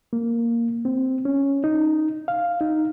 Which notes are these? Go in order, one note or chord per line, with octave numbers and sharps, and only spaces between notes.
A#3
C4
C#4
D#4
F5
D#4